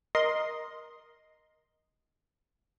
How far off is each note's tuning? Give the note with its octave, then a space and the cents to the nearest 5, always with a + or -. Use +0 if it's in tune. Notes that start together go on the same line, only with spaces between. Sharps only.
A#4 +15 D#5 +0 C6 +0